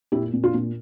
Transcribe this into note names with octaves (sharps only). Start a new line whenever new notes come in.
A#2 E4 G4
A#2
D4 F4
A#2